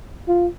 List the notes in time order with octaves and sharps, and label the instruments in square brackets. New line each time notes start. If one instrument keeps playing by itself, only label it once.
[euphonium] F4